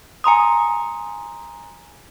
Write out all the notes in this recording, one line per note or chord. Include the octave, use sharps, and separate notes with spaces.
G#5 A#5 C6 D#6